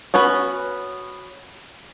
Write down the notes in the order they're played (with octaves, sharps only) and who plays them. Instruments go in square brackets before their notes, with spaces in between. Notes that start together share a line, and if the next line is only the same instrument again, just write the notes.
[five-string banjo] B3 C#4 F#4 B4